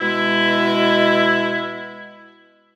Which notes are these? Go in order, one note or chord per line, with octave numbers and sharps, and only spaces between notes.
B2 G#3 E4